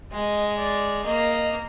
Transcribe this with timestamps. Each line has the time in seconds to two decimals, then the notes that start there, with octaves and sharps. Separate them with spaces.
0.12 G#3 D#5
0.58 D5
1.05 A#3 D#5